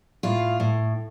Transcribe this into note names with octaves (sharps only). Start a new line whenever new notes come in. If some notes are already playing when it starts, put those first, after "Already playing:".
A2 F4
A2